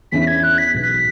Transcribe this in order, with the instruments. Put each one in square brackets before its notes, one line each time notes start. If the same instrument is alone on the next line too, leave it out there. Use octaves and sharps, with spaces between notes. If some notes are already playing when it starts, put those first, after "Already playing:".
[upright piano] E2 E3 C#4 E4 [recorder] B6
[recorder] G#6
F#6
B6
[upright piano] B1 B2 B3
[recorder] B6